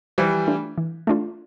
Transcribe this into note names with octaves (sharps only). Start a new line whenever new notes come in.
E3 F3 G3
A3 D4 F4
E3
A3 D4 F4